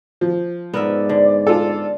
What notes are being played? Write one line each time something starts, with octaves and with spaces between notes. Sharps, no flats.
F3
G#2 B3 A#4 D5 E5
D3
F4 A4